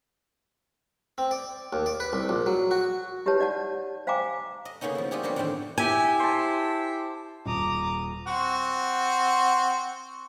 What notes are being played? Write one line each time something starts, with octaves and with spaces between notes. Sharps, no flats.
C4
D5
D#2
D5
B4
C2
A#1
F#3
F#4
E4 G4 B4 C#5 A5
D#4 D5 F#5 A5
C5 F5 G5 G#5 A#5 D6
D#5
C#3 A#3 B3 C#4 D#4
F3 E4
G3 D#4 F4 G4 G#4 C#5
A#3 C4 D4 F4 B4 C#5
E2 A2 D#3 G3 C4 D4
E4 G4 G#5
C5 A5
D#1 A#5 D6 D#6
C4 F#4 F#5